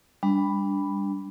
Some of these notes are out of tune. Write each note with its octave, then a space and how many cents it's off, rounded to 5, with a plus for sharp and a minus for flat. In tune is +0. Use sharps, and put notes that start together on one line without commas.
G3 +25 D4 -15 B5 +0